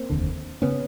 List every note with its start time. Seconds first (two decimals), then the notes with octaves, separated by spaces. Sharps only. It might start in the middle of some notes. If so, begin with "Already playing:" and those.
Already playing: A#3 C4
0.10 F1 D#2 D3
0.62 C#3 B3 C#4